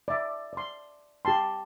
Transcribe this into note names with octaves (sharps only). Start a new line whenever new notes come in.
D5 E5
D5 C6
G4 G5 A5 C6